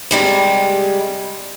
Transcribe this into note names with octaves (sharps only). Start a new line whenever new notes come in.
C3 G3 G#3